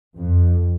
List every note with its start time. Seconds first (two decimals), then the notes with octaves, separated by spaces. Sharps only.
0.16 F2